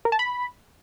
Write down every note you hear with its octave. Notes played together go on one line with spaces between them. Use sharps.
A#4
A5
B5